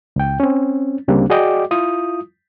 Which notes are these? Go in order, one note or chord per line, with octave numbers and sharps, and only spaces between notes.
C#2 G5
C4 C#4
D2 C#3 G3 A#3 C4 D4
F#4 G#4 D5 D#5 G5 D6
E4 F4 D#6